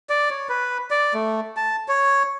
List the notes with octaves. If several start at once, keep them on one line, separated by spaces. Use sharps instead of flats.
D5
C#5
B4
D5
A3
A5
C#5